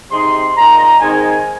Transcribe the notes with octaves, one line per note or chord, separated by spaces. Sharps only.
C3 G#3 C4 D#4 C6
A#2 G#3 D#4 A#5
G#2 D#3 G#3 C4 D#4 G#5